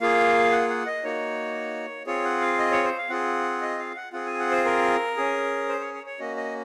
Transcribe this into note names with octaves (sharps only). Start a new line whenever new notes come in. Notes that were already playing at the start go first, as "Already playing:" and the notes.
A#3 F4 G#4 F5
F#5
F#5
D#5
A#3 D#4 F#4 C#5
C4 F4 G#4 C#5
F#5
F5
D#5
C#5
C5
F5
C4 F4 G#4 F#5
D#5
F5
F#5
C4 F4 G#4 F#5
G#5
F#5
C5
A#4
C#4 G#4
C5
C#5
C#5
C#5
A#3 C#4 F#4 D#5
D#5